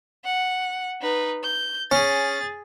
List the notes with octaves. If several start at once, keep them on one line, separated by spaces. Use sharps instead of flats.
F#5
D#4 B4
G6
C#4 G#4 A6